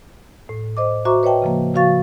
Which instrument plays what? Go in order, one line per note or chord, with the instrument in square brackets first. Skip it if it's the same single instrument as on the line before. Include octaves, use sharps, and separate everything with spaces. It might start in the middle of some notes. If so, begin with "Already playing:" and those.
[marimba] A2
C5 D#5 D6
F#4 C5 E5 A#5 C#6 D6
B4 C#5 D#5 E5 G5 A5
C#3 F3 A#3
C#3 F3 F#4 F5 C#6 A6